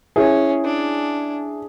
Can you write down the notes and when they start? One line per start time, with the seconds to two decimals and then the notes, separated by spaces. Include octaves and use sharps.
0.16 C#4 E4 G#4
0.65 D4